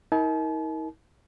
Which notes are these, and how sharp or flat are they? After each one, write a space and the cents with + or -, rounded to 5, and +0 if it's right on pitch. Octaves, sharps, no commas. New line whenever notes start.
D#4 +45 A#4 +0 A5 -45